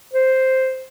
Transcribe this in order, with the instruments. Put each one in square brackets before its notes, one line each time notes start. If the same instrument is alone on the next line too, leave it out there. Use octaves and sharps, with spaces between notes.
[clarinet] C5